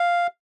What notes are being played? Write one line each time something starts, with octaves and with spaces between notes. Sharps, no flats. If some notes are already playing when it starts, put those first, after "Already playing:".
Already playing: F5